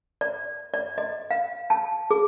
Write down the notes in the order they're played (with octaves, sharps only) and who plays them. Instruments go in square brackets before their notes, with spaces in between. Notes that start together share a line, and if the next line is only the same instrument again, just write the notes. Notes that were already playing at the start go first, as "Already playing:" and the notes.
[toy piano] D5
D5
D#5
F5
A5
G#4